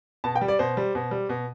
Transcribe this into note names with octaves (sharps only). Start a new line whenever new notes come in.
B2 A5
G5
G3
D5
B2 C5
G3
B2
G3
B2